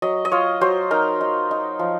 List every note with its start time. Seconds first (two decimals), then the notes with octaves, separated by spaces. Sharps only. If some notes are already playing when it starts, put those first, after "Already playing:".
0.02 F#3 D#5
0.25 D#5
0.32 F4 C#5
0.61 F#3 C5
0.91 D#4 A#4
1.21 D#4
1.51 D#4
1.79 F3